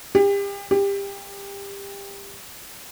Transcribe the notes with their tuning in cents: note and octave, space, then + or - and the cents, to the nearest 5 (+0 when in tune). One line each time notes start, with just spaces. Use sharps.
G4 +35
G4 +25